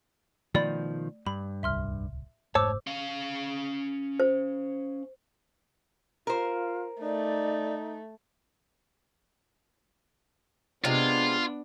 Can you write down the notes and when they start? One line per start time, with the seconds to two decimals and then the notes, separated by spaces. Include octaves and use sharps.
0.55 B2 D#3 F3 A3 D5 B5
1.27 G2 B5
1.63 D1 C2 E5 C6 F6
2.55 F1 G#2 A3 C5 C#5 A5 D6 E6
2.87 C#4 F5
4.20 C5
6.27 F4 A#4 C5
7.02 A3 D#4 D5
10.84 C3 G#3 B3 D4 F4